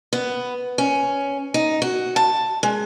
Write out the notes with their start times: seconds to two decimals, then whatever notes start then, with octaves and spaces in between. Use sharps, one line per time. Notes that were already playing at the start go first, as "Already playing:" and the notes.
0.13 B3
0.78 C#4
1.54 D#4
1.82 F#4
2.16 A5
2.63 G#3